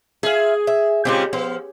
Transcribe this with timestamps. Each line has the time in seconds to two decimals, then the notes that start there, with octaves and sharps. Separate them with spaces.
0.23 F4 G#4 E5
0.67 E5
1.05 C#3 G#3 C4 D#4 F4 G4
1.33 F3 B3